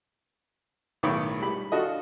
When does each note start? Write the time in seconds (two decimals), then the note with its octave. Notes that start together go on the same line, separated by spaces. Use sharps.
1.03 B1 A2 D#3 C#5 B5 D6
1.40 G3 B5
1.72 D4 F4 F#4 A4 D#5